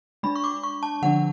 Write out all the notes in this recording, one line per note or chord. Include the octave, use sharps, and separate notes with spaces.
G#3 D4 B5
C#6
D6
C#6
A5
D3 F3 G#3 D4 F#5